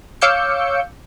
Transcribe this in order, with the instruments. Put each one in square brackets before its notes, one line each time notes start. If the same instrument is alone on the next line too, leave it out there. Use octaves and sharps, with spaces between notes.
[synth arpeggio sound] C#5 F5 D6 E6 G6 C#7